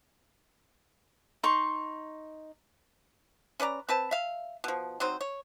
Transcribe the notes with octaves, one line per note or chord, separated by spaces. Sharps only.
D#4 C6 C#6
C#4 B4 D5 A#5
C4 B4 A5
E5 F5
B2 F3
F#3 C4 D#4 C5
C#5